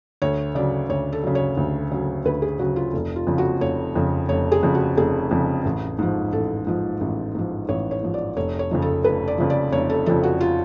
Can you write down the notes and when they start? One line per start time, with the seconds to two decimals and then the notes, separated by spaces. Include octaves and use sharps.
0.22 D2 C#5
0.55 C#3 F#3 D5
0.89 D2 C#5
1.12 A4
1.23 C#3 F#3
1.35 C#5
1.57 D2
1.91 C#3 F#3
2.25 D2 B4
2.42 G#4
2.59 C#3 F#3 F#4
2.76 F4
2.93 F1
3.16 F4
3.27 F2 C#3
3.38 F#4
3.61 F1 C#5
3.95 F2 C#3
4.29 F1 C#5
4.52 G#4
4.63 F2 C#3
4.75 F#4
4.97 F1 G#4
5.31 F2 C#3
5.65 A1
5.99 G#2 F3
6.32 A1 A4
6.67 G#2 F3
7.01 A1
7.35 G#2 F3
7.69 A1 C#5
7.91 C#5
8.02 G#2 F3
8.14 D5
8.37 F1 C#5
8.59 C#5
8.71 F2 C#3 F3
8.82 A4
9.04 F1 B4
9.28 D5
9.38 F2 C#3 F3
9.50 D5
9.72 F1 C#5
9.90 A4
10.06 F2 C#3 F3 A4
10.23 F#4
10.41 F4